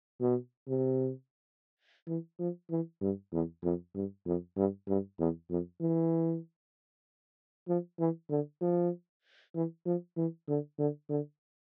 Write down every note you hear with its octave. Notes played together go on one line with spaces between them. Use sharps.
B2
C3
E3
F3
E3
G2
E2
F2
G2
F2
G2
G2
E2
F2
E3
F3
E3
D3
F3
E3
F3
E3
D3
D3
D3